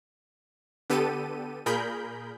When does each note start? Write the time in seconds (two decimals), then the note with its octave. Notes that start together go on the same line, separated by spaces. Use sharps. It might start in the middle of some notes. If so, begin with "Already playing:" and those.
0.90 D3 B3 G4 A4 D#7
1.66 A#2 G#4 A#4 B5 G6